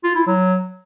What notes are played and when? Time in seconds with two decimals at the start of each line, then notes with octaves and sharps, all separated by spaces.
0.04 F4
0.15 E4
0.27 F#3